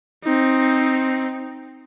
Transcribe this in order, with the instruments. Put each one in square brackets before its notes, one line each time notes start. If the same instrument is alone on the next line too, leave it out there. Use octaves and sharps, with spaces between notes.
[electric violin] C4 D#4